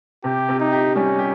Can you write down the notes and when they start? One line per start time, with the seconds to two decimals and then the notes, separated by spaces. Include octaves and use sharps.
0.24 C3 G4
0.48 C3
0.60 D#4
0.72 G4
0.96 G3 C#4
1.19 G4